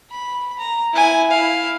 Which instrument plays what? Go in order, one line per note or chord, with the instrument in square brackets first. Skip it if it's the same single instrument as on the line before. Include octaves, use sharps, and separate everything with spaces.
[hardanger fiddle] B5
A#5
E4 G#5
E4 F5